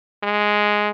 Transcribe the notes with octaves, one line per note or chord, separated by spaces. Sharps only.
G#3